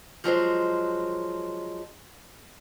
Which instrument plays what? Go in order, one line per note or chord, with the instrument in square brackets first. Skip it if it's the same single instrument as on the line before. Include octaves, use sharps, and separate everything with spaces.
[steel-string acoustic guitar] F3 F#3 G#3 C5